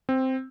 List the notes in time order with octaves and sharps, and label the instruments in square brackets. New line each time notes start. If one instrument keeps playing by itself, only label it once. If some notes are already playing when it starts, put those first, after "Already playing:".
[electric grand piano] C4